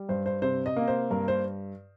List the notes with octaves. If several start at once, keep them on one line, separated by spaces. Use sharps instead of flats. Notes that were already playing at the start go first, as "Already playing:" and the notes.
Already playing: G3
G2 C5
C5
C3 C5
D#5
A#3
C5
G2 A#4
C5